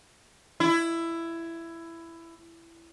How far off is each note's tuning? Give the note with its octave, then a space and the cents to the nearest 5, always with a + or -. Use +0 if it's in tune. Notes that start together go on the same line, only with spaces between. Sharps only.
E4 +15